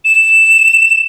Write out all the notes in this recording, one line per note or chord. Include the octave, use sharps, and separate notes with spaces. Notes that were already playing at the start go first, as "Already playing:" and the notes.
E7